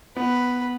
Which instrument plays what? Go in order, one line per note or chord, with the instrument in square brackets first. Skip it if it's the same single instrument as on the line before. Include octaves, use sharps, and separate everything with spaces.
[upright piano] B3 [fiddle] B4